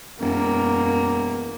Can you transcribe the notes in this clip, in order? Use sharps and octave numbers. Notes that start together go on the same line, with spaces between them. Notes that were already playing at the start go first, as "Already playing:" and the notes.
E1 F#2 A#3